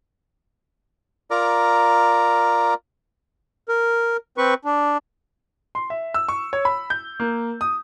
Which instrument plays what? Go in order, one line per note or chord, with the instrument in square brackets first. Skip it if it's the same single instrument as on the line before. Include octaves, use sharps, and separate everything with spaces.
[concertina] F4 A#4 D5 A#5
[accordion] A#4
C4 B4 C#6
D4
[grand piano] C6
E5
E6
C#6
C#5
B5
G6
A#3
D#6